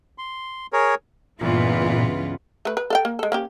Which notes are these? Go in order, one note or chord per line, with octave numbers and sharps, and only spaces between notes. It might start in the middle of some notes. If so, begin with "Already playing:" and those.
C6
G#4 A#4 C#5
C#2 G2 A#2 E3 B3 F4
A3 B4
B4
A4 F5 G5
A#3
G#3 A4
A#3 C#4 G4